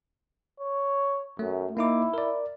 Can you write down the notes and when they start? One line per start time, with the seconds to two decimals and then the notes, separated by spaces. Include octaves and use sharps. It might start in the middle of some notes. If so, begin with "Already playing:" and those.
0.60 C#5
1.39 F#2 A3
1.77 A#3 D#4 E4 D6
2.14 A#4 D5